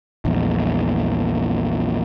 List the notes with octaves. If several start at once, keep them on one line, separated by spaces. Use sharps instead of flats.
A#1 E2